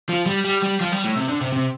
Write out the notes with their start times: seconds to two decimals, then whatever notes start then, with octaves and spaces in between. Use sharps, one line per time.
0.09 F3
0.26 G3
0.45 G3
0.63 G3
0.81 F3
0.93 G3
1.05 A2
1.17 C3
1.29 D3
1.41 C3
1.53 C3